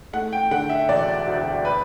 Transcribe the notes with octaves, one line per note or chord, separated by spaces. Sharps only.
A3 F#5
G5
D3 F#5
E5
E1 D5
D2
B4